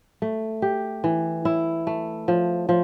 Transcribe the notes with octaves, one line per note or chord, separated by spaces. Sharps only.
A3
G4
E3
E4
A3
F3
F3